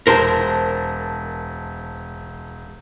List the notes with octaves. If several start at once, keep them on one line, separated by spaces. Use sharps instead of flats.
E1 A#4 C5 A5